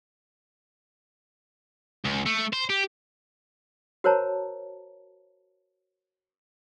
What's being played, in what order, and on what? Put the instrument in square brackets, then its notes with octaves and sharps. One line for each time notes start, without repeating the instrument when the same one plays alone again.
[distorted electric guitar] C#2
A3
C5
G4
[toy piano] F#4 A#4 C5 C#5 A5 A#5